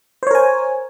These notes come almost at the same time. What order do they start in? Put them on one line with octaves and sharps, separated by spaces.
C5 C#5 A#4 G#5